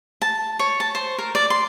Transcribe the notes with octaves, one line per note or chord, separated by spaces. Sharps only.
A5
C#5
A5
C5
A#4
D5
C6